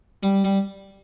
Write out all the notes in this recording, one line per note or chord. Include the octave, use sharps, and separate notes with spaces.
G3
G3